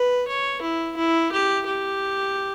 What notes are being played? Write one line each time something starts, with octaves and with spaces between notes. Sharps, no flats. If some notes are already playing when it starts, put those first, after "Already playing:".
Already playing: B4
C#5
E4
E4
G4
G4